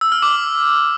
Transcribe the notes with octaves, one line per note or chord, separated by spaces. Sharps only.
E6
F6
D6